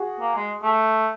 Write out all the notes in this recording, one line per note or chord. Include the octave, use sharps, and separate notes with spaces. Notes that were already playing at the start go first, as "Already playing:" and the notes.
Already playing: F#4 G#4
A#3
G#3
A3